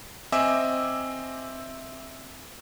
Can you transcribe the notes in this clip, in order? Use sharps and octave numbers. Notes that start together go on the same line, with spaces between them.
C4 D#5 E5 G#5 D6 E6